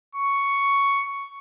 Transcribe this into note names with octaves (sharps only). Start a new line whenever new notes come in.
C#6